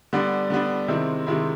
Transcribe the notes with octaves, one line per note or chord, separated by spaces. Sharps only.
D3 G3 B3 D4
D3 G3 B3 D4
C3 D#3 G#3 C4 E4
C3 D#3 G#3 C4 E4